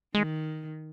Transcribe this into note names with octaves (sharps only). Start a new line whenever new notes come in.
D#3 G#3